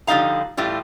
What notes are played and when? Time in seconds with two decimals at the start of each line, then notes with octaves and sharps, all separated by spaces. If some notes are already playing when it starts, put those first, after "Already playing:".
0.07 D3 F3 G3 D#4 F5 A#5
0.57 A2 E3 G3 F4